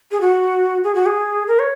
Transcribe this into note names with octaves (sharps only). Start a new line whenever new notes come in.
G#4
F#4
G#4
F#4
G#4
A#4
C#5